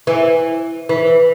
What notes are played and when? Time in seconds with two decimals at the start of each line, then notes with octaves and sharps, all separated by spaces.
0.07 E3
0.89 E3